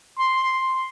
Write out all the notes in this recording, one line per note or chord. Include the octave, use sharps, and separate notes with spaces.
C6